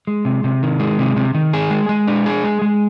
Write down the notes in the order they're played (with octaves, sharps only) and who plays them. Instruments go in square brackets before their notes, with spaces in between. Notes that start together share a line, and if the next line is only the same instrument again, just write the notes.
[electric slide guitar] G#3
C3
C3
D#3
G#3
C3
C3
D#3
G#4
G#3
G#3
D4
G#4
G#3
G#3